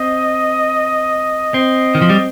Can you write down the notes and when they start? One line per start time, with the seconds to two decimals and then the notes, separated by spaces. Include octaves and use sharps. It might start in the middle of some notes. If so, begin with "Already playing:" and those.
Already playing: C4 D#5
1.54 C4 D#5
1.95 D#3
2.02 F3
2.10 G3